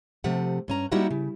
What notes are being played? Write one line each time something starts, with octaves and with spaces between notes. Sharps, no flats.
C3 F3 A3 G4 F#5
G2 C#4 A#5
G3 A#3 D#4 E4 F#4 F#5
C#3